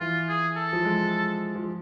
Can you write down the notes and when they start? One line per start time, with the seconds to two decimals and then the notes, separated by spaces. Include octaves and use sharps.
0.01 E3 F4
0.29 G#4
0.56 A4
0.73 F3
0.84 G#3
1.55 F3